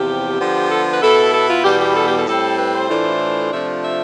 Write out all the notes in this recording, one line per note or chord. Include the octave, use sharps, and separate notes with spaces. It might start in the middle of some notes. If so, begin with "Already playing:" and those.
Already playing: E2 C3 F3 G4
D3 F3 B3
A4
B4
B2 B3 E4 A4
A4
F4
E2 B2 G3 B3 G4
G4
A4
G4
A4
A2 G3 C4 A4
B4
C5
A2 E3 A3 D4 F4
C3 F3 A3 D4 F4 E5
E5